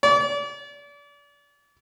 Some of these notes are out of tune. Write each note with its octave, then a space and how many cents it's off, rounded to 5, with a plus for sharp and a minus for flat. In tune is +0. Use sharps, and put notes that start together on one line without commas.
D5 -35